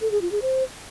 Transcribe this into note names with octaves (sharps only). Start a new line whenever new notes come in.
A4
G#4
F4
G#4
C5